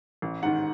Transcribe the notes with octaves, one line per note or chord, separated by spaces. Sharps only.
A1
G#2 D#3 F#5